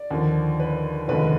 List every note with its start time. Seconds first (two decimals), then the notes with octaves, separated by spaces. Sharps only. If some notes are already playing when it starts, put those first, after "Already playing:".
Already playing: D5
0.11 D#2 D3 F3
0.60 B4
1.08 F1 D#2 D3 F3 G#3 B4